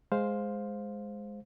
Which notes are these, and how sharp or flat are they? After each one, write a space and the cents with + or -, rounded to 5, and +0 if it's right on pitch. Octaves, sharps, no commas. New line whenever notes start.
G#3 +0 C5 +0 F5 +10